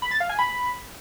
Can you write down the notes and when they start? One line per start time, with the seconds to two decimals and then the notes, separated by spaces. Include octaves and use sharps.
0.02 B5
0.11 A6
0.20 F5
0.30 G#5
0.39 B5